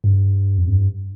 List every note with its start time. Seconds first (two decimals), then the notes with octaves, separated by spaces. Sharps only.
0.04 G2
0.58 F2
0.67 G2